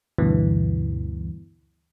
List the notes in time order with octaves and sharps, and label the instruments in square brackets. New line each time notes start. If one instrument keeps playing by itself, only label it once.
[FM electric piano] D2 G2 B2 E3